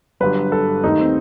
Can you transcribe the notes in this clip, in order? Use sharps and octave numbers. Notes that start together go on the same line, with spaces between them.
G1 G2 F#3 B4
A4
D#2 D#3 A3 D#4
C4